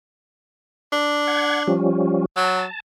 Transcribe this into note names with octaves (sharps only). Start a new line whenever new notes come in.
D4
F#5 G#6
F3 G3 C#4
F#3 A5